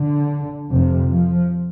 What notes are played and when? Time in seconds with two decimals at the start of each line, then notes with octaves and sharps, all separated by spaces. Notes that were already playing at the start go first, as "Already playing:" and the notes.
Already playing: D3
0.69 F2 C3 F3
1.07 F3